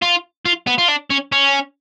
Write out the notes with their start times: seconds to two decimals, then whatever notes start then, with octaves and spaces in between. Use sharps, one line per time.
0.02 F4
0.45 F4
0.67 B3
0.78 F4
0.88 D4
1.10 C#4
1.32 C#4